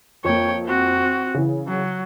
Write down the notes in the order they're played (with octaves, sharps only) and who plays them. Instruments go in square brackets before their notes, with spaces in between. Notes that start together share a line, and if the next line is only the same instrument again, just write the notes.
[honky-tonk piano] F2 A#3 [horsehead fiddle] C#5 G5
[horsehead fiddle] C4 F#4
[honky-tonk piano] C#3 E3
[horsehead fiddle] F#3